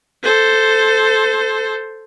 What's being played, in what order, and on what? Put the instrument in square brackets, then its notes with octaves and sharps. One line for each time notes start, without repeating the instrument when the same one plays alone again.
[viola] A4 C5